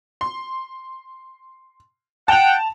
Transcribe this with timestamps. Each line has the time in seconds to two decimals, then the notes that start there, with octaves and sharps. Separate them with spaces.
0.21 C6
2.28 F#5 G5 A5 F7